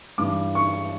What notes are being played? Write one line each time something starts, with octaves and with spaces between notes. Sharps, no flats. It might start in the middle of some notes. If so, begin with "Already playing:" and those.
G2 E3 D6
C#6